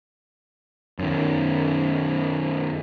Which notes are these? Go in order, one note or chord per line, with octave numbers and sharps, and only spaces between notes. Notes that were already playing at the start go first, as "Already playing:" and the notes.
F#2 D#3